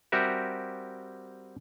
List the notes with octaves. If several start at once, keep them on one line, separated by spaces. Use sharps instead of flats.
G3 C4 F#4 G4 A#4 E5